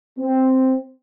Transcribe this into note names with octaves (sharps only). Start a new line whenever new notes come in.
C4